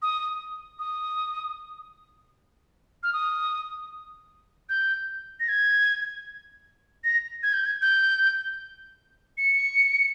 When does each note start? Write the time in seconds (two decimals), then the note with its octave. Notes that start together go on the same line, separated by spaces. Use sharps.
0.02 D#6
0.79 D#6
3.03 F6
3.13 D#6
4.69 G6
5.40 A#6
5.48 G#6
7.04 A#6
7.43 G#6
7.53 G6
7.65 G#6
7.82 G6
9.38 C#7